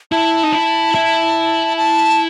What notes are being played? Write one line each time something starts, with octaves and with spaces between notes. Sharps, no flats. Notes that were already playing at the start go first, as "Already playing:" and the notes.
E4 A5
D#4
E4
E4
A5